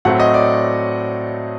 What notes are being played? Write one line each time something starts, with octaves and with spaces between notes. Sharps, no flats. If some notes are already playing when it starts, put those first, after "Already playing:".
A2 F#3 A3 C4 F#5
D#5
D5